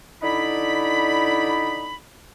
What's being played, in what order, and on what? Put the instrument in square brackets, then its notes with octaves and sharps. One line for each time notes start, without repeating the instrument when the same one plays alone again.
[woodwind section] D3 D#4 E4 D5 B5